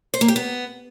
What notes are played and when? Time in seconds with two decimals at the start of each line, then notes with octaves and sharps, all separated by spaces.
0.14 C5
0.21 A#3
0.28 G4
0.36 B3